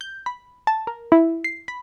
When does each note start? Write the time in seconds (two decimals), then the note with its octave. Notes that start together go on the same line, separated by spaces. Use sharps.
0.01 G6
0.26 B5
0.67 A5
0.87 A#4
1.12 E4
1.44 C7
1.68 B5